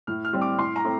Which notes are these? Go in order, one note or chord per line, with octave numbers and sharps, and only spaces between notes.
A2 F6
F6
G3 C4
D6
A2 C6
A#5
A3 C4